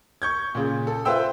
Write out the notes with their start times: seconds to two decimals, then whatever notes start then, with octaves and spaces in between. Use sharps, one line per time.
0.22 C#6 G6 G#6
0.55 A#2 C#3
0.87 A4
1.05 F4 B4 C5 E5 G5 E6